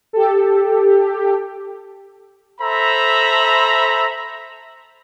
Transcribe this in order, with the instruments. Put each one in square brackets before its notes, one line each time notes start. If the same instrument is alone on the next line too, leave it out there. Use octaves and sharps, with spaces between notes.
[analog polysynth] G4 A4
[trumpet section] A4 C5 E5 A#5 B5